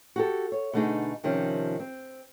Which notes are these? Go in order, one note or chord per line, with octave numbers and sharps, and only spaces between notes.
F#4 G4 A4
C#5
B2 D3 A3 D4 D#4 G#4
C3 D#3 F3 C#4
C4